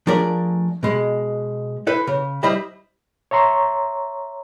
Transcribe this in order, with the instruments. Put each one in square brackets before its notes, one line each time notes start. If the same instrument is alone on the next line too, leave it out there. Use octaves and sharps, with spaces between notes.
[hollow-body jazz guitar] F3 A3 D4 G#4 A#4 D5
B2 G#3
E4 A4 B4 C5
C#3
G3 E4 C5 D#5 E5 B5
[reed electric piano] C#5 E5 A#5 C6 C#6